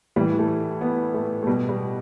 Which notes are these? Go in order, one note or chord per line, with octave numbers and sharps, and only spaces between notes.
A2 E3 G3
A3
B3
A3
A3
B2 G3
G3